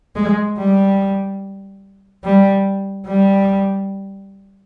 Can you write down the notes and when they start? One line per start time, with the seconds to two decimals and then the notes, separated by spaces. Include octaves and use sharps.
0.16 G#3
0.58 G3
2.24 G3
3.07 G3